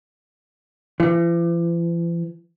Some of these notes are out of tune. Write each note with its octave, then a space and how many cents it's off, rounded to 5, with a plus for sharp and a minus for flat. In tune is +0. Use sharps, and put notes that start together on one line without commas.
E3 +45